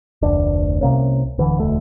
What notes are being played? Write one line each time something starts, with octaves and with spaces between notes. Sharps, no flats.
F1 D2 D4
C2 C3 A#3 C#4
D1 D3 E3
E1 D2 A3